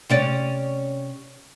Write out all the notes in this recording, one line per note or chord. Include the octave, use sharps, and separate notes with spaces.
C3 C#4 D5